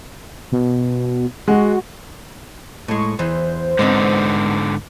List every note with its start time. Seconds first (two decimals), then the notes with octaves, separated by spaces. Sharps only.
0.52 B2
1.48 G#3 F#4
2.88 A2 G#3 C#6
3.19 E2 E3 C5
3.79 G#2 D3 G#3 B3 C4